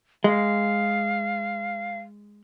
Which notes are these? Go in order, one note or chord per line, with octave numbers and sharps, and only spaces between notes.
G#3 F5